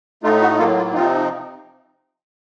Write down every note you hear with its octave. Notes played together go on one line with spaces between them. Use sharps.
A2 A3 D#4 F4
F#4
A2 F#3 A#3 F4 A4
F4
C3 F3 C4 D#4 F4